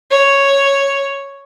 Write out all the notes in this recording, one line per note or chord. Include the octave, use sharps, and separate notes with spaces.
C#5